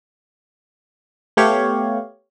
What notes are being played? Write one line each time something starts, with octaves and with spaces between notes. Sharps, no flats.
A3 B3 G4 C#5 F5